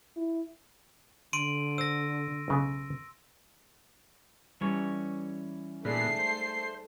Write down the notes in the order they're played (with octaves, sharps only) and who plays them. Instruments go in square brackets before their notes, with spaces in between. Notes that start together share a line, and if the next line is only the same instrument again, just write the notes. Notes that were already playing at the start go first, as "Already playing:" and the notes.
[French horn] E4
[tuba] D3 [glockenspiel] C6 D7 D#7
[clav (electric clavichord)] C5 [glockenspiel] E6 A#6
[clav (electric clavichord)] B1 C#3 B3
[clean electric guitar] E3 C#4 C#5 [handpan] G3
[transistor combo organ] A#2 B3 [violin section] A3 C7 [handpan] D#4 G#4 D5
[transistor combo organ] C5